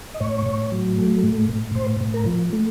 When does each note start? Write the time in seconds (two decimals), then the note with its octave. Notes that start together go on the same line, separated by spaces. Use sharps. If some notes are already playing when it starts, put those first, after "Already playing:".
0.14 D#5
0.20 A2 C#5
0.46 A2
0.72 F#3
0.98 A3
1.23 A2
1.49 A2
1.75 A2 C5
2.00 A2
2.14 A#4
2.26 F3
2.53 A3